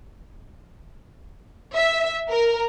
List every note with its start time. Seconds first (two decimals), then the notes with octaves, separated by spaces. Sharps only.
1.74 E5
2.29 A#4